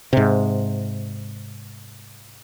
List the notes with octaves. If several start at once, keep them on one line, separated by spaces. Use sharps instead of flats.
G#2 C3